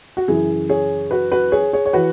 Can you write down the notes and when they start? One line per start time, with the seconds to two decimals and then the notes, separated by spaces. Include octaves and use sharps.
0.17 F#4
0.28 F#2 C#3 E3 E4 G#4
0.69 G#4 C#5
1.11 F#4 B4
1.32 F#4 B4
1.52 G#4 C#5
1.73 G#4 C#5
1.86 C#5
1.93 E3 F#4 B4